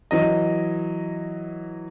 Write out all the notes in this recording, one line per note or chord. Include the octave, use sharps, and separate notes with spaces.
E3 F#3 D#5